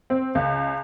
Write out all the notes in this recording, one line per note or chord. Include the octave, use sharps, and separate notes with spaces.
C4
C#2